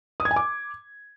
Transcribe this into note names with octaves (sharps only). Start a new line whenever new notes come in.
D#6
G#6
G#5
D6